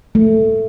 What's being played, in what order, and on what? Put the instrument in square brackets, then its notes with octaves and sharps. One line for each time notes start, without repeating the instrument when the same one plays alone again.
[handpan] A3